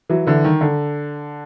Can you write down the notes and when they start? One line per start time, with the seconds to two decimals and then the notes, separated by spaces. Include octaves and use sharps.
0.09 E3 F#3
0.27 D3 E3
0.44 D#3
0.61 D3